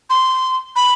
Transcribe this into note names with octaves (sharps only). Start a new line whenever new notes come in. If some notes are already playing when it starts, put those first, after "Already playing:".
C6
B5